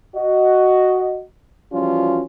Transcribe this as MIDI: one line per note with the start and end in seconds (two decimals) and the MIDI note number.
0.16 1.22 66
0.16 1.22 75
1.73 2.23 52
1.73 2.23 53
1.73 2.23 55
1.73 2.23 61
1.73 2.23 65
1.73 2.23 66